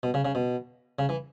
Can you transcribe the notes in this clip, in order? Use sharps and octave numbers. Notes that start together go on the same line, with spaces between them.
B2
C#3
C#3
B2
C#3
E3